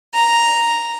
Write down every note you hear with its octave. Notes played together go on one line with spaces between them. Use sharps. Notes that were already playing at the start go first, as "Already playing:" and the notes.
A#5